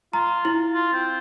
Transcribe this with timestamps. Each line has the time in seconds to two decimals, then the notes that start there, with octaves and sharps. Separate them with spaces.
0.13 F4 A#5
0.45 E4
0.73 F4
0.93 C4